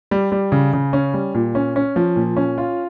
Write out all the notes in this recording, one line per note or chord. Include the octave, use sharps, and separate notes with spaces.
G3
G3
C#3
C#3
C#4
G3
A#2
C#4
C#4
F3
A#2
C#4
F4